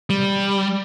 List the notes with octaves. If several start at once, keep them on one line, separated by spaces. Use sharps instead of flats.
G3